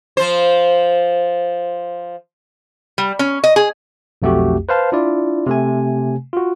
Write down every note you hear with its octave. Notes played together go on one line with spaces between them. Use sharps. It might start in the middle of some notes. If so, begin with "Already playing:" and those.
F3 C5
G3
C#4
D#5
G#4
B1 F2 A3 F#4 G4
B4 C5 F5 A5
D4 E4 F4 D5
C3 A3 G#5
F4 F#4